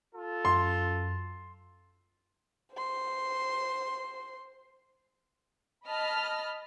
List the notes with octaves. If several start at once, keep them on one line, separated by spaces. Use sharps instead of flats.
F4 A4
F#2 C6
C5 C6
D#5 A5 B5 F6